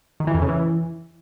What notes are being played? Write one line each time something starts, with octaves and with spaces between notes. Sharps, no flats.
D#3
E3
F2
C#3
E3